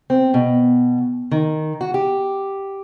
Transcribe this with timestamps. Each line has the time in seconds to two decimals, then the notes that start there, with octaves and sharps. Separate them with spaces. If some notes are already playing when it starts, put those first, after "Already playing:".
0.10 C4
0.34 B2
1.31 D#3
1.81 F#4
1.94 G4